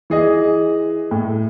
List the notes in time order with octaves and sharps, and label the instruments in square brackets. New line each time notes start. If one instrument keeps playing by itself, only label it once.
[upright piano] E3 G#4 D#5
A2